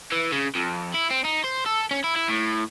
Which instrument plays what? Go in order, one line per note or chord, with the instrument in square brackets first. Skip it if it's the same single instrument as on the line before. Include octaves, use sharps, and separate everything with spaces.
[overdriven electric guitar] E3
C#3
F2
E4
C4
D#4
C5
A4
C#4
E4
E4
A2